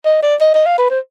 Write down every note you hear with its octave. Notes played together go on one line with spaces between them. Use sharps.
D#5
D5
D#5
D#5
F5
B4
C5